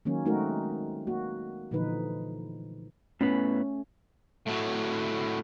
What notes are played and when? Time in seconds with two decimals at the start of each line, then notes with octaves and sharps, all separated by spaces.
0.05 D#3 F#3 A#3 C#4
0.25 G#3 A3 C4 D#4 F#4 A#4
1.07 A#3 F#4
1.71 A#2 D3 E3 F3 D#4 B4
3.21 A2 A3 B3 C#4 B4
4.46 A2 F#3